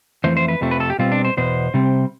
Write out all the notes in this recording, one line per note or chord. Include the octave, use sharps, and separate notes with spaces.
F2 E3 A3 C5
C5
B4
F2 C3 F3 A3
B4
A4
G4
B2 G3 C4 F4
D4
C5
E2 B2 B3 C5
C3 G3 C4